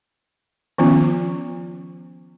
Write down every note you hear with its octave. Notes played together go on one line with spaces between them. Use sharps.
D#3 F3 B3 C#4 F4